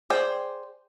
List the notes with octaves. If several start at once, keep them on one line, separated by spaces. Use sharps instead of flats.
G#4 C5 D5 G5